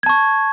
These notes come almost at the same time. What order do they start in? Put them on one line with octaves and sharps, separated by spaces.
G#6 A5 C#6